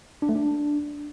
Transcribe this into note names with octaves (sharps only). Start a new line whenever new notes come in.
D4
A3
D4